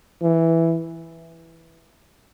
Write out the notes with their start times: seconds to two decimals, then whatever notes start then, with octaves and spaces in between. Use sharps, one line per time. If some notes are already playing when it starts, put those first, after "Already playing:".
0.22 E3